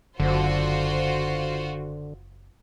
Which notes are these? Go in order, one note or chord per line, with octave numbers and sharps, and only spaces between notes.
F#1 D3 F4 F#4 C5